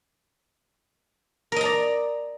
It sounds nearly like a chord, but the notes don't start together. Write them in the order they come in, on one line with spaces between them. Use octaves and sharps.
A#4 D#5 A#5 D5